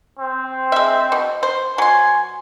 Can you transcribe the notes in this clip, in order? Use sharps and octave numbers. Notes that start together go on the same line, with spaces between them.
C4
G#3 E5
B2
C5
F#3 G#5 C6